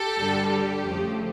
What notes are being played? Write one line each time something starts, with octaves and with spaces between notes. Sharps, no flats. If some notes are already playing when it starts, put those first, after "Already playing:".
Already playing: G4 A4
G2 D3 G3
G4
F2 C#3 F3 A3